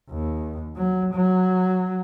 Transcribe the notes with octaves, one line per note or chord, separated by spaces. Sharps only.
D#2
F#3
F#3